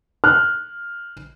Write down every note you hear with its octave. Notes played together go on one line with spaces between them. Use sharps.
F6 F#6